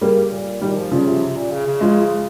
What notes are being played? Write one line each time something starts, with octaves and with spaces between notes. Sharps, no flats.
C#3 G3 A#3
A#2
A#2 D#3 G3
F3
C#3 F3 G3
C3
C3
A#2
C#3
C#3
F3 G#3